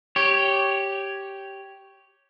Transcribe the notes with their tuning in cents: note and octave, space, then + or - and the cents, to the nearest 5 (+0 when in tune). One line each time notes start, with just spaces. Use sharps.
G4 -5 C#5 +0